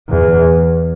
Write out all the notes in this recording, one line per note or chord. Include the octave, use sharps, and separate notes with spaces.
E2